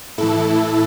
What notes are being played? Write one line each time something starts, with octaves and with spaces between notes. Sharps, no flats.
A2 E3 E4 A4